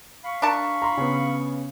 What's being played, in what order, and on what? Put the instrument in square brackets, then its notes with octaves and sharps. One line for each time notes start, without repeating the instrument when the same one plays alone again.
[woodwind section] F5 B5 C#6
[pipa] D4 A#4 A5
[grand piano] A#5 C6
C#3 B3